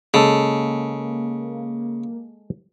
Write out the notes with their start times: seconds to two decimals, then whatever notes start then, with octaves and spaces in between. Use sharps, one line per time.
0.14 C#3 G#3 A#3 A4